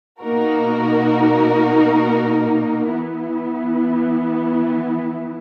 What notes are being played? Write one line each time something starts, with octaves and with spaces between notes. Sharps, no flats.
B2 A#3 D#4 F#4 A#4
E3 B3 E4